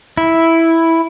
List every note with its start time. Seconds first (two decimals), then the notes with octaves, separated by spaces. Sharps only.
0.17 E4